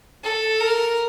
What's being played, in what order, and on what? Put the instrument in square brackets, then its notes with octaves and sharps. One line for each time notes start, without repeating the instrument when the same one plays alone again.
[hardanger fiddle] A4
A#4